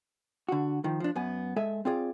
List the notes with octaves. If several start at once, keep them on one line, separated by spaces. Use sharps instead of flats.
D3 F#4
D#3 F3
F3 D4
F#2 B3 G#5
G#3 A4 E5 G#5
C4 F4 G#4 D5